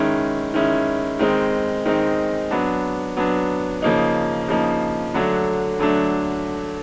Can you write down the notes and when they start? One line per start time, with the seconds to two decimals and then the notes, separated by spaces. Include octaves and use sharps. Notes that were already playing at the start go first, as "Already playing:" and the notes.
Already playing: D#3 G#3 C#4 E4
0.54 D#3 G#3 C#4 E4
1.19 D#3 G#3 C4 D#4
1.85 D#3 G#3 C4 D#4
2.51 F#3 B3 D4
3.17 F#3 B3 D4
3.82 C#3 F3 A#3 D#4
4.48 C#3 F3 A#3 D#4
5.14 D3 F#3 A3 D4
5.79 D3 F#3 A3 D4